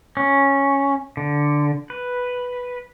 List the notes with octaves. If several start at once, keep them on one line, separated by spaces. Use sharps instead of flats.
C#4
D3
B4